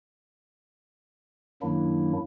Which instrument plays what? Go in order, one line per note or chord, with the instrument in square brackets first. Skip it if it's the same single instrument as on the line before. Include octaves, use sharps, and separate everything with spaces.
[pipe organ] F#2 D#3 F#3 A#3 D4 E4